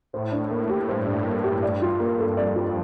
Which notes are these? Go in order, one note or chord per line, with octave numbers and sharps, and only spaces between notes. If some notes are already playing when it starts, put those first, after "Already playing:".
A2 C5
D4
A#3
G4
G2 C5
D4
A#3
G4
D5
F4
A#3
A4
F2 D5
F4